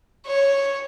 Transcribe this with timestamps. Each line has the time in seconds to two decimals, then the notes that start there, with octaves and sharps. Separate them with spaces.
0.25 C#5